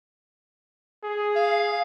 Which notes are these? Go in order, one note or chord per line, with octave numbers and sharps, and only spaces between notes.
G#4
F5